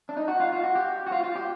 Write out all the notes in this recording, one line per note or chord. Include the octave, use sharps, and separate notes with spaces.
D4
D#4
F#4
F4
F4
F#4
G4
F#4
F4
F4
G4